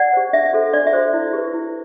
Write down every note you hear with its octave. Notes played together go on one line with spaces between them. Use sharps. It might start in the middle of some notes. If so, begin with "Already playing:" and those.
Already playing: D5 F#5
G4 C5
D4 E5
F#4 A4 C5
D4 D5
E5
F#4 A4 C5
E4
G4 B4
E4